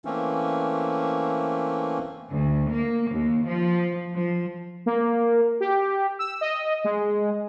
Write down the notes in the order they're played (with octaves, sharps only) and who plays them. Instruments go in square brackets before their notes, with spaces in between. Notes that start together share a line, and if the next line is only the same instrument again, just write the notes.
[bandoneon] E3 A3 A#3 C4 C#4
[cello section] D2
A#3
D#2
F3
F3
[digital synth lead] A#3
G4
E6
D#5
G#3